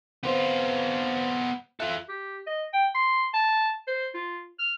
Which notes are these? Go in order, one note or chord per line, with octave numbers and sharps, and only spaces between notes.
B3 C4 F4 B4 C5
F4 A4 E5 F#6
G4
D#5
G5
C6
A5
C5
F4
F6